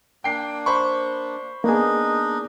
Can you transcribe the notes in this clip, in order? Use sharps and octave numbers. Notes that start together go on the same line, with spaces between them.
A#3 D4 G5 C7
C5 B5 C#6
A#3 B3 D4 D#4 G#4 D#5